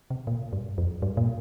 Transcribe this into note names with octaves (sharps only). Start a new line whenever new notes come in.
C3
A#2
G2
F2
G2
A#2